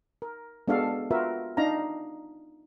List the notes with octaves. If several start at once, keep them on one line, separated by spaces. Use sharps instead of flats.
A#4
G#3 B3 D4 F#4 A4 F5
F4 F#4 A#4 B4 E5
D4 D#4 F5 A#5